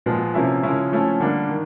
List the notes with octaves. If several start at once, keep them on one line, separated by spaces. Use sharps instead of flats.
A#2 F3 G#3 B3
C3 F3 A#3 C#4 E4
C#3 F3 G#3 C#4 E4
F3 A3 C#4 E4
D3 G3 A#3 D4
D#3